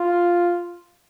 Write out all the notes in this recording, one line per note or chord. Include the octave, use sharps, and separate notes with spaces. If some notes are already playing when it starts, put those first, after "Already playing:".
Already playing: F4